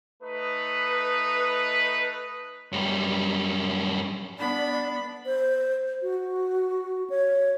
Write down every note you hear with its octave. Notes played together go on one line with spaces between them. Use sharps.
A3 D#4 B4
F#2 G3
B3 D4 D5 B5
C5
F#4
C#5